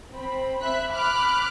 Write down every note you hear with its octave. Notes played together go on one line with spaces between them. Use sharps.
C4 B5
E5 B5 F#6 B6
B5 D6 F6 F#6